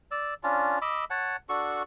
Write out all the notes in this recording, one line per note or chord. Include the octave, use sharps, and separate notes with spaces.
D5 E6
C#4 D4 F4
D#5 B5 D6 E6
C#5 F#5 A5
D4 F#4 A4 C#6